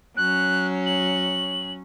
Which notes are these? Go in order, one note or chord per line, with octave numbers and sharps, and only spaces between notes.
F#3 C#4 F#6
F#7